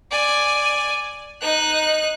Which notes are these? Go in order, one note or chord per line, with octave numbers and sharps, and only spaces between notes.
D5 G#5
D#4 F#6